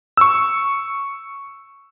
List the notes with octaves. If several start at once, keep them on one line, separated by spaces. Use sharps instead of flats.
C#6 E6